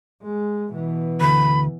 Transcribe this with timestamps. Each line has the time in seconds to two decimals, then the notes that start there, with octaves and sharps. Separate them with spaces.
0.23 G#3
0.70 B2 E3
1.21 D2 B5